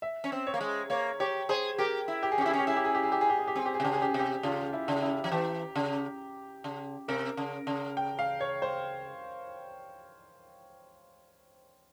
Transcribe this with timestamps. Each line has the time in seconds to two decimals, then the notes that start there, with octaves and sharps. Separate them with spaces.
0.02 E5
0.24 C#4
0.32 C4
0.47 C#5
0.54 A#3
0.61 G#3
0.90 A#3 C#5
1.20 G4 C#5
1.49 G#4 C5
1.78 G4 A#4
2.08 E4
2.23 G4
2.32 G#4
2.38 C#4
2.41 G4
2.46 E4
2.50 C#4 G#4
2.59 G4
2.67 E4 G#4
2.76 G4
2.85 G#4
2.95 G4
3.03 G#4
3.12 G4
3.21 G#4
3.29 G4
3.39 G#4
3.47 G4
3.56 C4 G#4
3.66 G4
3.74 G#4
3.80 C3
3.84 C#3 G4
3.93 G#4
4.02 G4
4.10 G#4
4.14 C3
4.19 G4
4.43 C#3 F4
4.73 E4
4.88 C#3
5.02 E4
5.24 F3
5.32 E3 G4
5.76 C#3
6.64 C#3
7.08 C3 A#4
7.37 C#3
7.67 C#3
7.97 G5
8.19 F5
8.40 C#5
8.62 C5